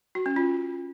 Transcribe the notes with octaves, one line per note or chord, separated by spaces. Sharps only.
F#4
C#4
F4